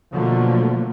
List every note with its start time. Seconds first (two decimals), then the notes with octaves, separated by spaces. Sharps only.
0.12 B2 D3 F3 F#3 A3 A#3